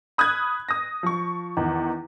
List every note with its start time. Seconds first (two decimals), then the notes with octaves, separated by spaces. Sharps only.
0.18 B5 D#6 F6 F#6 G#6
0.69 D#6 A#6
1.03 F3 C#6
1.57 E2 D#3